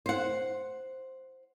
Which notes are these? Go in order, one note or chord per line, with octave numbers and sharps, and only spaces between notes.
C5 F#5